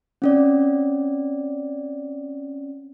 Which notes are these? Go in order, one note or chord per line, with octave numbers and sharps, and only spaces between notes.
C4 C#4 D5